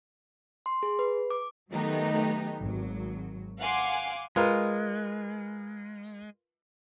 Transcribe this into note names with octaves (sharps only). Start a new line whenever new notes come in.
C6
G#4
B4
D6
D#3 F#3 A3 B3 D#4 G4
G#1 F#3
F5 F#5 G#5 C6 D6
G#3 F4 A#4 B4